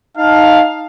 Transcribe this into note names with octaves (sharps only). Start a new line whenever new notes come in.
D#4 F5 A5